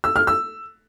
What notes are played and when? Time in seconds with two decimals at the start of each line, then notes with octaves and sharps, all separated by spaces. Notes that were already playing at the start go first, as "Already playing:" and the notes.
0.04 E6
0.16 F6
0.27 E6